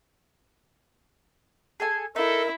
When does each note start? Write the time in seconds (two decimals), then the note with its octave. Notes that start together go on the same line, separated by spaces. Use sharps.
1.80 G#4 A4 G#5
2.16 D#4 E4 A4 A#4